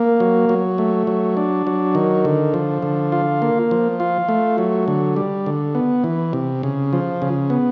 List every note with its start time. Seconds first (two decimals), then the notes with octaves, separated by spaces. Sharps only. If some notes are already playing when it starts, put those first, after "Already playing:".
Already playing: A#3
0.20 F#3
0.49 F#3
0.78 A3
1.07 F#3
1.37 D4
1.67 F#3
1.95 D#3
2.25 D3
2.54 F3
2.82 D3
3.12 F4
3.42 A#3
3.71 F3
4.00 F4
4.29 A3
4.58 F#3
4.88 D3
5.16 G3
5.46 D3
5.75 B3
6.04 E3
6.33 C3
6.63 C#3
6.93 F3
7.22 C#3
7.50 B3